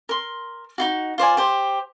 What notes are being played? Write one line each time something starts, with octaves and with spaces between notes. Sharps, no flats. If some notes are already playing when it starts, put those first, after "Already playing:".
A#4 C6
D#4 F4 F#4
F4 C5 D5 G#5
G4 C5